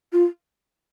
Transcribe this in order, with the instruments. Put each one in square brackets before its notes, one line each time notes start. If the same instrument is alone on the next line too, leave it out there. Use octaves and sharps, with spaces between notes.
[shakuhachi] F4